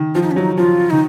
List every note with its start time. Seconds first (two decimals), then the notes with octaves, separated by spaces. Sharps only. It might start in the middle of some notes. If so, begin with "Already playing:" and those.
Already playing: D#3
0.15 F3 F4
0.22 D#4
0.31 C#4
0.36 F#3 D#4
0.58 F3 F4
0.90 D#3 D#4